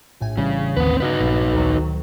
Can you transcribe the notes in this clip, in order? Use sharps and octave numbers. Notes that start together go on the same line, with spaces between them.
A#1 A2 G#5
C#3 E3 G3
A1 D#2 D3 E3 C4 B4
G2 C#3 D#4 F#4 B4
A#1
D2 D#3 F#3